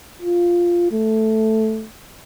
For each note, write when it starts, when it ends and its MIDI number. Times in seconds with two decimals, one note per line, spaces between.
0.22 0.89 65
0.92 1.87 57